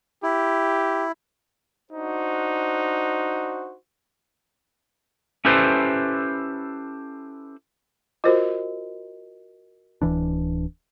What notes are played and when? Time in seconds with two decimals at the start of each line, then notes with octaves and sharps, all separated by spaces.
0.23 E4 G4
1.90 D4 D#4 F#4 C5
5.45 C#4 E4 G4 A4 B4 C5
8.24 F4 F#4 A#4 C5 D#5
10.02 D1 E3 D4